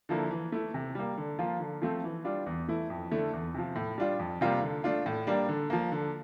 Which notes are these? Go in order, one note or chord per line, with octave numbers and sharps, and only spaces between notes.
D3 F3 A#3 E4
E3
A3 E4
C3
G3 A#3
D3
F3 A#3 F4
D3
F3 A3 C4
E3
G3 D4 F4
E2
E3 A3 E4
F2
D3 A3 E4
E2
C3 F3
A2
G3 D4 F4
F2
C3 G3 A#3 F4
D3
A3 D4 F4
A2
G3 A#3 D4
D3
F3 A#3
D3